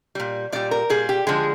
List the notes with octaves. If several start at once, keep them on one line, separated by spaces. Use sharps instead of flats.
A#2 G3
A#2 G3 D5
A#4
A#2 G3 G#4
G4
D3 F3 G#3 G#4